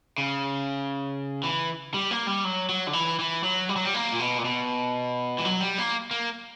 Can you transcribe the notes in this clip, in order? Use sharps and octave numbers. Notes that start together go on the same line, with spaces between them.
C#3
E3
G3
A#3
G3
F#3
F#3
D3
E3
E3
F#3
G3
F#3
G3
A#3
A#2
B2
A#2
B2
E3
F#3
G3
A#3
A#3